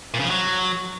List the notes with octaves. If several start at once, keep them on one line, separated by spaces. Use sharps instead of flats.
A#2
C#3
F3
F#3